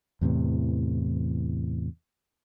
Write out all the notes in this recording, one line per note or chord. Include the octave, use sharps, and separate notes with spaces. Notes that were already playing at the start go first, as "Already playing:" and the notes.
E2 A2 C3 E3